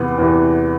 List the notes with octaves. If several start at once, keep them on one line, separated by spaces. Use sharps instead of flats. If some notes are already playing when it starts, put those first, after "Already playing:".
Already playing: E2 C3 E3 B3
E2 C3 E3